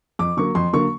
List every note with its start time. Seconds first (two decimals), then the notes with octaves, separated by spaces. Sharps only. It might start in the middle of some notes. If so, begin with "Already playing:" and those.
0.19 F2 D6
0.37 D3 F#3 A#3 C#6
0.55 F2 C6
0.73 D3 F#3 A#3 C#6